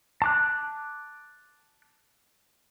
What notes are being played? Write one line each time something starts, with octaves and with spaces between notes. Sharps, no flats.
A5 D6 F#6